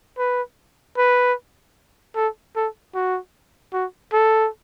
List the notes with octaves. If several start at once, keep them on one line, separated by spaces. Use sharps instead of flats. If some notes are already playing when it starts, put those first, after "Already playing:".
B4
B4
A4
A4
F#4
F#4
A4